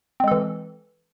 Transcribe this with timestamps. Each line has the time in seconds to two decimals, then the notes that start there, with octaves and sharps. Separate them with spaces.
0.20 C4
0.24 G#3
0.28 A4
0.31 E3